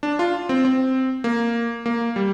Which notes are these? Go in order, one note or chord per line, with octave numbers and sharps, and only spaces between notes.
D4
F4
C4
C4
A#3
A#3
G3